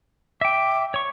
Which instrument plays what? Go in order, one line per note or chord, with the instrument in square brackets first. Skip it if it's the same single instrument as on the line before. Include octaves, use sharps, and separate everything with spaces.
[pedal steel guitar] E5 G5 [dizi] D6
[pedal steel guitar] C#5 C#6